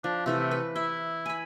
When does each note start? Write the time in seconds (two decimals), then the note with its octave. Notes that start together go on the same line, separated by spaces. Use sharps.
0.04 F3 D4
0.26 C3 E3 A3 E5
0.51 B4
0.76 E4 E5
1.26 G#5 B5